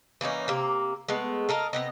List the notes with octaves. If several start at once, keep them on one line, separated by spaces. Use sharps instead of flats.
E3 A#3 C#4 D#4
C3 A#3
G#3 A3 B3
A4 A#4 D#5 F5
C3 B3 D#5